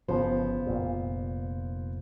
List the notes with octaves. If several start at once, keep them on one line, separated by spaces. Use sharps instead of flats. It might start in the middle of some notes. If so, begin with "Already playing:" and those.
G1 C#3 F3 B3 C5
F1 A#2